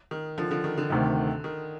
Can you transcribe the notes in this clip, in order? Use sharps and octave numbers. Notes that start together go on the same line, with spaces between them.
D#3
D3 F3
D3 F3
D#3
D3
D2 C3 D#3
D#3